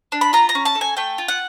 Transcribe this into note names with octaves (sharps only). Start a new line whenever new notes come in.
D4
B5
F4 A#5
A#5
C#4
A5
A4
G#5
A3 G5
F4
F#5